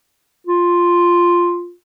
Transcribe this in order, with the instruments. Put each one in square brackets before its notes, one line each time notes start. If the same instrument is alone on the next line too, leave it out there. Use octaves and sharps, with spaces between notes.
[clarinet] F4